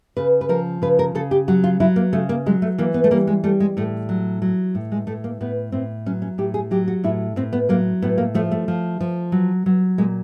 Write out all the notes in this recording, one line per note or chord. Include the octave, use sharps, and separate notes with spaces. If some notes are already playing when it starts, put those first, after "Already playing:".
C#3 B4
B4
F3 A#4
C#3 B4
A#4
C#3 A4
G4
F#3 F#4
F4
F#3 E4
A#3
C#3 A3
A#3
F#3 G#3
A3
E3 A#3
B3
A3
G3 A#3
G#3
G3 A3
G#3
A2 A3
F#3
F#3
A2
G#3
A2 A3
A#3
A2 B3
A2 C4
F#3 C#4
C#4
A2 G4
G#4
F#3 G4
F#4
A2 E4
A2 C4
B3
F#3 A#3
A2 B3
A#3
F3 A3
A3
F3
F3
F#3
F#3
A#2 G#3